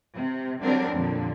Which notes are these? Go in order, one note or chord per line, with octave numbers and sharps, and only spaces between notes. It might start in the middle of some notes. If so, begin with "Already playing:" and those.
C3
D3 F#3 G3 C4 D4 A#4
F2 A#2 D3